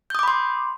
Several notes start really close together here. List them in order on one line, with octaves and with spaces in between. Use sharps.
G6 D#6 D6 B5 C6